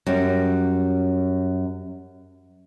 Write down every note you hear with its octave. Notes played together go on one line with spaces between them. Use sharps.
F#2 G3